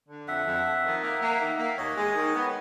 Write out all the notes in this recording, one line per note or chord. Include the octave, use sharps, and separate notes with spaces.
D3
F2 E5 F#5
F2
F2
D#3
A#3 E5 F#5
A#3
D#3
A#3
D#2 C#5 D#5
G#3
D#3
B3